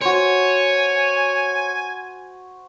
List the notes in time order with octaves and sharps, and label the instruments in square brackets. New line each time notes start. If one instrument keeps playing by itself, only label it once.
[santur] F#4 C5 [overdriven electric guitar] C#5 [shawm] G#5